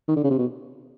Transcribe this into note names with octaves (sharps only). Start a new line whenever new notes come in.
D#3
D3
C#3
C3
B2